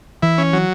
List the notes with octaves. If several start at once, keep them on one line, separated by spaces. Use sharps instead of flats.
E3 E4
C#4
F#3